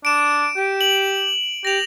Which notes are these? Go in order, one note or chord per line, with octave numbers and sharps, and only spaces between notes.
D4 D7 E7
G4
F#7
G4 A#6 F7